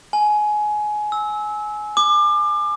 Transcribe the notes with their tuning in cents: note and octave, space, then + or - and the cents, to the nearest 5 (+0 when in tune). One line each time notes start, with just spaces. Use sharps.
G#5 +20
E6 -20
D6 +30